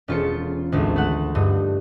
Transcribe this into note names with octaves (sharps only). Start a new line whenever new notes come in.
E1 C#4 F4 A4 C5 C#7
G#1 D2
A3 F#5
G2 D#4